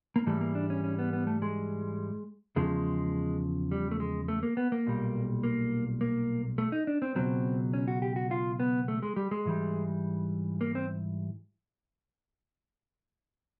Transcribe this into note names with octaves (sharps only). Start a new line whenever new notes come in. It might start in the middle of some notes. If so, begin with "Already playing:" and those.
A#3
G#2 E3 G3 A3
A#3
D4
C#4
C#4
B3
B3
A3
G#3
E2 C#3 F3 G#3
G3
A3
G#3
A3
A#3
B3
A#3
B1 A#2 G3
A#3
A#3
A3
D#4
D4
C4
C#2 B2 F#3 C4
C#4
F#4
G4
F#4
F4
B3
A3
G#3
G3
G#3
G#2 E3 G3
A#3
C4